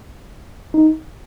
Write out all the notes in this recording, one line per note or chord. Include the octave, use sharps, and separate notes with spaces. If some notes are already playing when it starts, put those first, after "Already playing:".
D#4